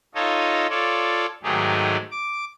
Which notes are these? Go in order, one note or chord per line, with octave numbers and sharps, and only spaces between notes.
D#4 F4 A4 C#5 D#5
F4 A4 C#5 D5
G#2 D#3 F#3 A3 G4 G#4
D6